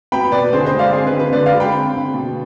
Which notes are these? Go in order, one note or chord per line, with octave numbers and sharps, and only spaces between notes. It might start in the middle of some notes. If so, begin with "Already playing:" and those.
B3 G5 B5
B2 B4 D5
D3 G#4 C5
C5 D#5
G#3
D5 F5
C4 G#4
B4
D3
B4
D3 B4 D5
D5 F5
G#3
G5 B5
C4
D3
B2